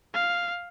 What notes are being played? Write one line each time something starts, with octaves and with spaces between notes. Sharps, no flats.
F5